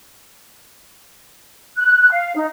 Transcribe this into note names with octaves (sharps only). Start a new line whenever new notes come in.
F#6
F5
D#4